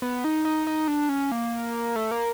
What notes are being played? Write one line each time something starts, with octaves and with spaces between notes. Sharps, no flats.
B3
D#4
D#4
D#4
D4
C#4
A#3
A3
A#3